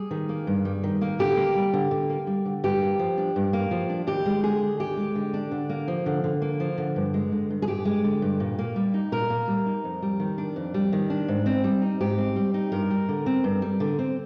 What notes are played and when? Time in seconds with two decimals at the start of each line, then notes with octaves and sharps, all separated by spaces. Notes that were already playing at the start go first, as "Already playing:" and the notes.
Already playing: G3 G#4
0.11 D#3
0.29 A#3
0.47 G2
0.65 G3
0.83 D#3
1.01 A#3
1.19 D3 G4
1.37 A#3
1.55 G3
1.73 D3
1.91 D3
2.10 A#3
2.27 G3
2.45 D3
2.64 G2 G4
2.81 A#3
2.99 F3
3.18 D4
3.36 G2
3.53 A#3
3.71 F3
3.89 D4
4.07 D#2 G4
4.25 G#3
4.43 D3 G#4
4.61 D4
4.80 D#2 G4
4.97 G#3
5.15 D3
5.34 D4
5.51 D3
5.69 A#3
5.88 F3
6.06 D3
6.24 D3
6.42 A#3
6.60 F3
6.78 D3
6.96 G2
7.14 G#3
7.32 D3
7.50 G2
7.62 G#4
7.67 G2 G4
7.85 G#3
8.04 D3
8.22 G2
8.40 A#2
8.59 A#3
8.76 G3
8.94 D#4
9.12 A#2 A#4
9.30 A#3
9.48 G3
9.66 D#4
9.84 F2
10.02 G3
10.20 D#3
10.38 D4
10.56 F2
10.74 G3
10.93 D#3
11.10 D4
11.28 G#2
11.46 C4
11.64 G3
11.82 D#4
12.00 G#2 G4
12.18 C4
12.36 G3
12.54 D#4
12.72 G2 A#4
12.91 G3
13.09 D3
13.26 C4
13.44 G2
13.62 G3
13.80 D3
13.99 C4